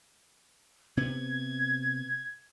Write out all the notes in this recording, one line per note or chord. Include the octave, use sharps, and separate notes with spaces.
C3 B3 G#6